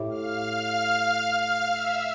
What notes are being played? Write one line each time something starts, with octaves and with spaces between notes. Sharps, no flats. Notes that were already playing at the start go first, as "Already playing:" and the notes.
Already playing: A2 G4
F5 F6
F5 F6
E5 E6